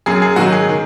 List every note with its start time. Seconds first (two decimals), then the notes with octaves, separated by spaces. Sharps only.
0.06 F#2 F#3 G#4
0.22 G#4
0.36 G#2 D#3 F#3 F#4
0.52 G#4
0.69 D#3